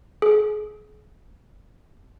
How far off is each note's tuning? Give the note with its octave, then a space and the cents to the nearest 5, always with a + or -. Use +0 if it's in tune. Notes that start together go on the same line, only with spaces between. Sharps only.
G#4 +35